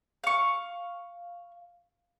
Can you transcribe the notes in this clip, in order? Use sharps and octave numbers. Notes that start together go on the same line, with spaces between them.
F5 C#6